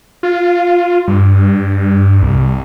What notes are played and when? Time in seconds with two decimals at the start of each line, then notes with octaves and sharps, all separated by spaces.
0.23 F4
1.08 G2
2.22 C2